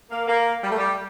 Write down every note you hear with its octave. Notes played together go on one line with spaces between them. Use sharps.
A#3
A#3
G3
A3
G3